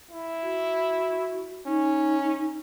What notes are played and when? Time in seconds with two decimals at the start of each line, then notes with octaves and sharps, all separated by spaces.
0.11 E4
0.42 F#4
1.66 C#4 D#4